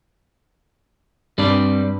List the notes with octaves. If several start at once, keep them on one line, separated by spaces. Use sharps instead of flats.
G2 G3 C4 D5